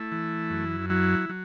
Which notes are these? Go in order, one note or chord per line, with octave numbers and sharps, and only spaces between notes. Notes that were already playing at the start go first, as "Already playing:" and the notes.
Already playing: A3 E4
E3
F#2
F#3 E4
F#3